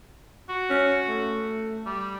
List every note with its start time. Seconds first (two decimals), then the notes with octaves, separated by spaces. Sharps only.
0.49 F#4
0.70 C#4
1.08 A3
1.86 G3